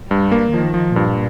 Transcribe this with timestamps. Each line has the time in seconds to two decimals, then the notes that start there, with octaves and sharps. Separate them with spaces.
0.10 G2 G3
0.32 A#3
0.54 D#3 F3
0.74 F3
0.96 G2 A#2